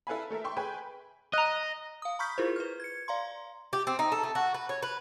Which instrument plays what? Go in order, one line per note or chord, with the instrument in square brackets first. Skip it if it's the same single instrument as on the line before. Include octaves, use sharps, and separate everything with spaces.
[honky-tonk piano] E4 A4 B4 F5 G#5 B5
A3 A4 A#4 E5
E5 G5 C6 C#6
G#4 B4 G5 G#5 B5
[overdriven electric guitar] D#5 [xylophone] A#5 F#6
[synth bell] F5 D#6
A#5 B5 C#6 F6 G6 B6
E4 F4 G#4 A#4 C5
B4 F6
G#6 C#7
D5 F5 A#5 C6
[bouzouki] G4
C4
D#4
A4
A3
F#4
B4
C#5
B4